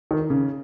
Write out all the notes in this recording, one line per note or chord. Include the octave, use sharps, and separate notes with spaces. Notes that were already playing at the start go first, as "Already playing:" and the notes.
D#3
C#3